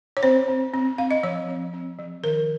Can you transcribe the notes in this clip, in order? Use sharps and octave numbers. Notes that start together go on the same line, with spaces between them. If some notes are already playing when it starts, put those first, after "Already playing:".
C#5
C4 C5
C4
C4
C4 F5
D#5
F3 C#5
C4
C4
F3
D#3 A#4